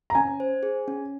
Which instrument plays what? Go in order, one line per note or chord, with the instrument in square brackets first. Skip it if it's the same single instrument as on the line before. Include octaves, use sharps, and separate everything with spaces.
[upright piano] A#5
[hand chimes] C#4 [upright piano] G#5
[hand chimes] C5
G#4
C#4